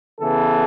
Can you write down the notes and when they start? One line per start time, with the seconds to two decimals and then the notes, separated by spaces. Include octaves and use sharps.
0.20 C#3 E3 B3 A4